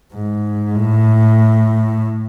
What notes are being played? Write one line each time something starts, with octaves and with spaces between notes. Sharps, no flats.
G#2
A2